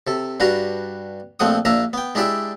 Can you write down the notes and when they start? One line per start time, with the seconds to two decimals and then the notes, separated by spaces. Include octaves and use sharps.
0.07 C3 A4
0.40 G2 G3 D4 F#4 B4 A#5
1.40 A#1 F3 A3 C4 F#5 D#6
1.65 A#1 A#3 D4 E5 A#5
1.93 B3 G5
2.15 G#3 D4 E4 G4 D5 E5